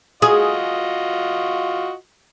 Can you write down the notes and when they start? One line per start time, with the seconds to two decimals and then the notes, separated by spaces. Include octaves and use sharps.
0.22 F4 F#4 G#4 D#5